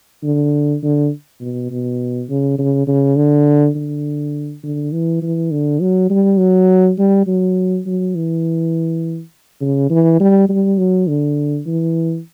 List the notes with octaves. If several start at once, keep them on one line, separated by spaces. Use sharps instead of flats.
D3
D3
B2
B2
C#3
C#3
C#3
D3
D3
D3
E3
E3
D3
F#3
G3
F#3
G3
F#3
F#3
E3
C#3
E3
G3
G3
F#3
D3
E3